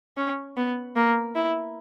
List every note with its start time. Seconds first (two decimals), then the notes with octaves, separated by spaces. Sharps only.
0.17 C#4
0.57 B3
0.96 A#3
1.35 E4